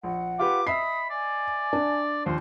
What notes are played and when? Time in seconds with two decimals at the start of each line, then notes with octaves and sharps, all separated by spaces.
0.04 A#1 F#5
0.39 F4 G4 B4 D6
0.67 D#5 E5 B5 D#6 C7
1.10 D5 G#5
1.73 D4
2.26 D#2 F3 C5